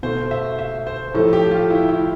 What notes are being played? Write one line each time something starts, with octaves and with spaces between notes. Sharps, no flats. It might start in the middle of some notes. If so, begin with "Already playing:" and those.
B2 A3 C5
E5
E5
C5
A2 F3 A3 A4
G4
F4
E4
E4